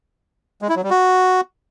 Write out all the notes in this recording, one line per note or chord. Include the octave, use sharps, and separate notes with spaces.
G#3
E4
F#3
G3
F#4